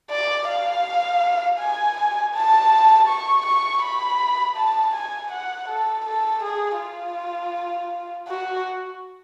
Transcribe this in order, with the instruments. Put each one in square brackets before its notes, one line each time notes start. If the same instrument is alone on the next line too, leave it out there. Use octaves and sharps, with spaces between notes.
[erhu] D5
F5
G#5
A5
C#6
C#6
B5
A5
G#5
F#5
A4
A4
G#4
F4
F#4